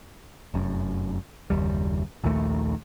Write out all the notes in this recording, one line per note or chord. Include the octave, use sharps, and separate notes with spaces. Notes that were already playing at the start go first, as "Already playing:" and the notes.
F1 F#2
F#1 D#2 G3
A#1 D#2 D#3 A3